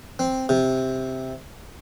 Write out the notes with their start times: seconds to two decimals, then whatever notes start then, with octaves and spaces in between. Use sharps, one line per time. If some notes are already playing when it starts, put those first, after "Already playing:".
0.19 C4
0.49 C3